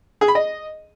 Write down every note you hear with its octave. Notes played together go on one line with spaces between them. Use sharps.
G#4
B5
D#5